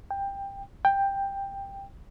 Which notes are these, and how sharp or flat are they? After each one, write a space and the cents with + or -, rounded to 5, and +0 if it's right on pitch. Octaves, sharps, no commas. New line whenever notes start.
G5 +15
G5 +10